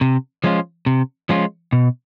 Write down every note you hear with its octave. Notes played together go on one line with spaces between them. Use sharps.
C3
F3 G#3 C#4 F4
C3
F3 G#3 C#4 F4
B2